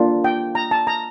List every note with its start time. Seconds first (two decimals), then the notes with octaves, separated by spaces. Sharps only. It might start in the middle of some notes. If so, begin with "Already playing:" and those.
Already playing: A#3 D4 F4
0.24 G5
0.55 A#5
0.71 A5
0.87 A#5